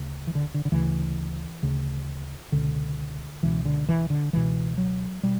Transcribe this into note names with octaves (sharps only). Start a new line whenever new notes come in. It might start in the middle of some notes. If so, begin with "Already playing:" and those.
Already playing: D2 C#3
E3
D3
D3
D3
D2 C#3 E3
D2 C#3
C#2 B2 D3
C#2 B2 E3
D3
E3
D3
C#2 B2 E3
F#3
B2 G3